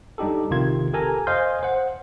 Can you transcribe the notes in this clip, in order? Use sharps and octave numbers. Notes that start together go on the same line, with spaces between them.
G3 D4 D#4 G4 A4
A#1 C3 D#3 F4 C6 G#6
G4 A4 A#4 G#5 A#5
C5 D#5 F5 G#5 C6 G6
C5 F#5